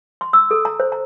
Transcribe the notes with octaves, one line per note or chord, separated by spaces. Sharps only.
C6
E6
A4
A#5
C5
A#5